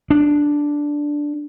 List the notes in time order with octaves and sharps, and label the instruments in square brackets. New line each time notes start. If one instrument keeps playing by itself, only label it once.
[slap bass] D4